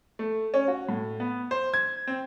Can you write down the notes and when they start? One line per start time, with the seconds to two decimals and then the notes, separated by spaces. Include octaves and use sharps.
0.19 A3
0.54 C#4
0.68 F#4
0.89 A2
1.20 B3
1.51 C5
1.74 G#6
2.07 C4